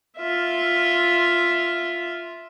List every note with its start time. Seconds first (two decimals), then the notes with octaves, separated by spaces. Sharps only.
0.17 F4 E5